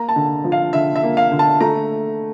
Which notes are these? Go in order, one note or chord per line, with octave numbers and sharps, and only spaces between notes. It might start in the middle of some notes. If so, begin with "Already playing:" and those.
Already playing: A#3 A#5
A5
D3
F3
F5
D3 E5
E5
A#3
F5
D3
A5
A3 A#5